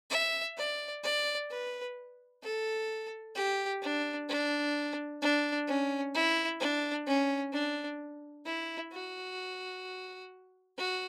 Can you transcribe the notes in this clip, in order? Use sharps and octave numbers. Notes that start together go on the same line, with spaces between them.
E5
D5
D5
B4
A4
G4
D4
D4
D4
C#4
E4
D4
C#4
D4
E4
F#4
F#4